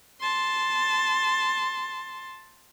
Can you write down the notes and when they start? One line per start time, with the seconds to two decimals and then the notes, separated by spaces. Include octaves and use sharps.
0.21 A5 C6